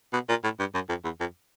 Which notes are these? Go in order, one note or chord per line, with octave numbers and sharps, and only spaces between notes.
B2
A#2
A2
G2
F#2
F2
E2
F2